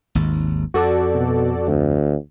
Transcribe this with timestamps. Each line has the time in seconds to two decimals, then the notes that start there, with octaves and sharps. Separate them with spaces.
0.15 G#1 D#2
0.74 F2 F#4 A4 D5
1.15 B2
1.67 D2